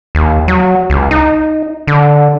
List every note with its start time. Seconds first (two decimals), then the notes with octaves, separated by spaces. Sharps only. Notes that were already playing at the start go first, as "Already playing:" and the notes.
0.15 D#2
0.48 F#3
0.90 C#2
1.11 D#4
1.87 D3